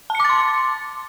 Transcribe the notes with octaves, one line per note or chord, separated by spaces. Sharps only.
A5 C6 D6 A6 C#7